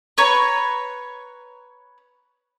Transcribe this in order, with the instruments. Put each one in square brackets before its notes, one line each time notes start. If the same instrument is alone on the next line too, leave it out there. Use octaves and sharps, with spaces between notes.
[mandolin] B4 C#5 A#5